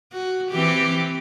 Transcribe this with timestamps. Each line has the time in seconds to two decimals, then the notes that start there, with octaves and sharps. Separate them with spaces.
0.13 F#4
0.52 E3 C4 G4